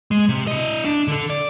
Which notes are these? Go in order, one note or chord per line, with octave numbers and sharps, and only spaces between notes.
G#3
C3
E4 D#5
D4
D3 A4
D5